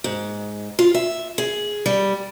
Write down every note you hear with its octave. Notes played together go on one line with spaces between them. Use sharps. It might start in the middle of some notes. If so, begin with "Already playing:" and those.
G#2
F4
E5
G#4
G3